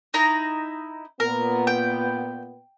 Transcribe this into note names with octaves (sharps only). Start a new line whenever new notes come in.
D#4 E4 A#5
A#2 B3 A#4
G5